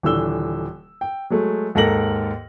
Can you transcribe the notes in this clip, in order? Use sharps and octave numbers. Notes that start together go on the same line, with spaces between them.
D#1 D3 E3 E6 G7
G5
F#3 G#3 A3
D#2 G#2 A4 A#4 A#6 F#7